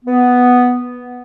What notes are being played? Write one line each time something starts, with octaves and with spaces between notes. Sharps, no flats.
B3